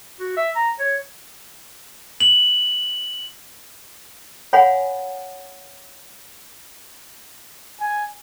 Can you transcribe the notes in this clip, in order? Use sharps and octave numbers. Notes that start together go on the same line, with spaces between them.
F#4
E5
A#5
C#5
F#7
C#5 F5 F#5 G#5 B5
G#5